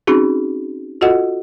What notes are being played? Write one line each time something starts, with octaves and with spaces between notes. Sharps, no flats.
C4 C#4 D#4 F#4 G#4
F4 F#4 A4 D#5 F#5